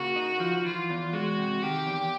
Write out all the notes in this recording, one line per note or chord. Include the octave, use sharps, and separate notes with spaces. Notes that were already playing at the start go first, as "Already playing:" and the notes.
Already playing: C#3 A#3 F#4
D#4
F3
E3 F4
E2
G#3 F#4
C3
D#3 G4
E2